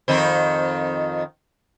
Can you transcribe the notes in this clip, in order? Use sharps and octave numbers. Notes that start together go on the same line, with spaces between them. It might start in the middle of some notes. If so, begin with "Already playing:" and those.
F2 D#3 C4